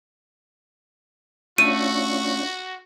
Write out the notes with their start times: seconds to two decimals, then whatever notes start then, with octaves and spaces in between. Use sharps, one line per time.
1.58 A3 C#4 D4 F4 F#4 D#7